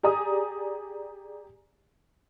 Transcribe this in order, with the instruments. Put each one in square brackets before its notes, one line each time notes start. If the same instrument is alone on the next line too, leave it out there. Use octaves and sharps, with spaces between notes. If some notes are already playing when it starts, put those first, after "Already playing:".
[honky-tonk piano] G4 G#4 D5 G#5 A#5 D#6